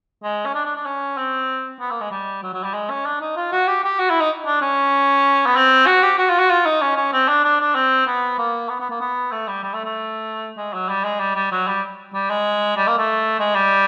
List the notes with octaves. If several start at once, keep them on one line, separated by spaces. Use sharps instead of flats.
G#3
C#4
D4
D4
D4
C#4
C4
B3
A#3
G#3
G3
F#3
F#3
G3
G#3
C#4
D4
D#4
F4
F#4
G4
G4
F#4
E4
D#4
D4
C#4
B3
C4
F#4
G4
F#4
F4
F#4
F4
D#4
C#4
C#4
C4
D4
D4
D4
C4
B3
A#3
B3
B3
A#3
B3
A3
G3
G3
A3
A3
G#3
F#3
G3
G#3
G3
G3
F#3
G3
G3
G#3
G3
A#3
A3
G#3
G3